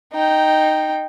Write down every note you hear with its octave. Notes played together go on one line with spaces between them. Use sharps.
D#4 G5